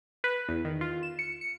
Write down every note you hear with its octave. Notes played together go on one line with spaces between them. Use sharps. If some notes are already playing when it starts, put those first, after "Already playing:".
B4
E2
D#3
F4
E7
C#7
C#7